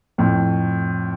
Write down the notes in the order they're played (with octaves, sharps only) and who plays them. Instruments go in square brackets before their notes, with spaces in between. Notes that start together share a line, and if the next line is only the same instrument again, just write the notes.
[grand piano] F2 A2